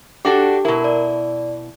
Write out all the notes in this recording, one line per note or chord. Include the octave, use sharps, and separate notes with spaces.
D4 F#4 G4 A4 G5 D6
B2 E4 A#4
D5